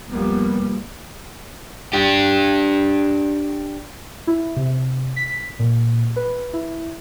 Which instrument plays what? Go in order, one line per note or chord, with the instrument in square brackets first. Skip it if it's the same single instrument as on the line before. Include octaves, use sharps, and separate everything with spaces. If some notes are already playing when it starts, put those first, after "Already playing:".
[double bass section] F1 F3 G3 A#3 B3
[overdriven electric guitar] D4 G4
[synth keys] E4
C3
B6
A#2
B4
E4